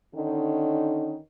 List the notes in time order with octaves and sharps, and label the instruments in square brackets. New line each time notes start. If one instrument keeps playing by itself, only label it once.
[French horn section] D3 D#3 C#4 D#4